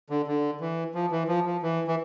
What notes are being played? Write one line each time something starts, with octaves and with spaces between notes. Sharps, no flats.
D3
D3
E3
F3
E3
F3
F3
E3
E3